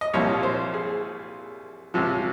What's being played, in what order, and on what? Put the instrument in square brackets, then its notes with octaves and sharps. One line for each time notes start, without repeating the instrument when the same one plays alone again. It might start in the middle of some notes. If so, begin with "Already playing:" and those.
[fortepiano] D#5
C2 A#2 F3 C#5
C5
G#4
C#2 C3 F3